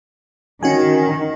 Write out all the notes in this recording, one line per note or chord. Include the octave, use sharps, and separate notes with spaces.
D#3 C#4 F#4 G#5